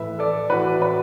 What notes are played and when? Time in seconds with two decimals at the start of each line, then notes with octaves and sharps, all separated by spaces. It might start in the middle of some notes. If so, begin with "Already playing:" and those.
Already playing: A2 E3 A3 B4 E5
0.19 A4 D5
0.50 A2 E3 A3 F#4 B4
0.82 F#4 B4